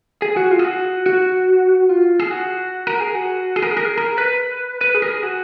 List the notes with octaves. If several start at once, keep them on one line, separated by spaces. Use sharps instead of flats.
G#4
F#4
F4
G#4
F#4
F#4
F4
G#4
F#4
A#4
G#4
F#4
G#4
A#4
G#4
A#4
G#4
A#4
B4
B4
G#4
A#4
G#4
F#4